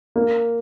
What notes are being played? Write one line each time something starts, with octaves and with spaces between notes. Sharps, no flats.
A#3